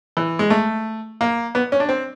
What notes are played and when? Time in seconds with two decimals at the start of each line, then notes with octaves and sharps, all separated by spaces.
0.17 E3
0.39 G#3
0.50 A3
1.21 A#3
1.55 B3
1.72 C#4
1.80 D4
1.89 C4